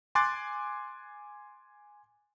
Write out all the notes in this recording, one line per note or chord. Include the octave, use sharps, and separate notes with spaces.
G#5 C6 D6 F#6 A6